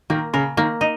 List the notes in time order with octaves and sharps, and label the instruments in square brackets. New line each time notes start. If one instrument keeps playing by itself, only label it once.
[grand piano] D#3 [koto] A#3
[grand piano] C#3 [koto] A#4
[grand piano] D#3 [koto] A#3
[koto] D#4